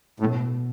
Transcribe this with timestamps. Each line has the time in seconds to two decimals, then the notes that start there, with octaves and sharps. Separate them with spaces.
0.20 A2
0.24 B2